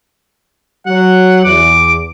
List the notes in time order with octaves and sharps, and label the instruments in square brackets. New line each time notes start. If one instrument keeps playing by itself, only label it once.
[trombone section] F#3 [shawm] F#5
[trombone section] E2 [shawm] D6